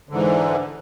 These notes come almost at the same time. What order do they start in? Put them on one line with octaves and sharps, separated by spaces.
D3 G#2 E3